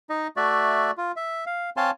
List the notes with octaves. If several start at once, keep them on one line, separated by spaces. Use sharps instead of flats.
D#4 D#5
A3 F#4 D5 E5
F4
E5
F5
C4 C#5 F5 G#5 A5 C6